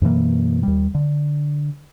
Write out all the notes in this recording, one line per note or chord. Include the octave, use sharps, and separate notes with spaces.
F#2 B2 E3 A#3
D#2 G3
D3